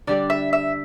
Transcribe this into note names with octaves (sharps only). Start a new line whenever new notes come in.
D3 G3 D4 D5
E5
E5